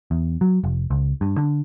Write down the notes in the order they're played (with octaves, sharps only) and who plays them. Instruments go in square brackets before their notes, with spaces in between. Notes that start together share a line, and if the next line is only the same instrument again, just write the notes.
[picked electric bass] E2
F#3
F1
C#2
G2
D3